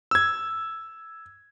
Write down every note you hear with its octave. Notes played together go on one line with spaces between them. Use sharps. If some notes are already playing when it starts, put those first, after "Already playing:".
E6 G#6